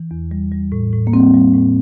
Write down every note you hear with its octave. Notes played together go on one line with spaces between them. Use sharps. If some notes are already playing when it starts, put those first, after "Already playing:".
Already playing: E3
E2
G3
G3
A2
A2
A#3
G3 C4
G3
A2